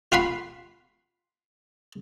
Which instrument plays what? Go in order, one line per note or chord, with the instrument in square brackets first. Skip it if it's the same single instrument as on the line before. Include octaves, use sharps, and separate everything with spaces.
[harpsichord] F4 F#5 B5 C6